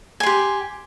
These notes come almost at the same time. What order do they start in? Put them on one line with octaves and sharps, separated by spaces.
G#5 C6 G4